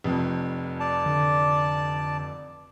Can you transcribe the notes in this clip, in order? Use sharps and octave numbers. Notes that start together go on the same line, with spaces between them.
F1 F2
D5 A5
D3